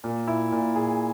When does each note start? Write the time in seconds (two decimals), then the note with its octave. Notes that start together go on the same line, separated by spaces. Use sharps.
0.04 A#2
0.27 E4
0.52 A#2
0.75 G#4